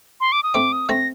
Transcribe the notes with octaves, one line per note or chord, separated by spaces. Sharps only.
C6
D6
D#6
A3 C4 D6
D#6
A3 C4 A#6